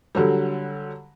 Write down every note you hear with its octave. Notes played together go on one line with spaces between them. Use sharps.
D3 F#3 G3